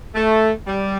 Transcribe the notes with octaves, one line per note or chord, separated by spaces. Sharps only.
A3
G3